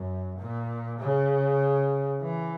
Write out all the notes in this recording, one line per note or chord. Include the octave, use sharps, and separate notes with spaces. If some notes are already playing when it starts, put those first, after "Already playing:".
Already playing: F#2
A#2
C#3
E3